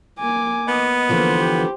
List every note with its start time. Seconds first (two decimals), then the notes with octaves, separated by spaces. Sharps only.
0.19 A#3 G#5 D6
0.68 B3 D#5
1.09 D3 E3 F3 A#3 C5
1.40 G4